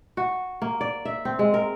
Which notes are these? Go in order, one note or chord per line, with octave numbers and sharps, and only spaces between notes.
F#4
A#3
D5
E5
C4
G#3
A#4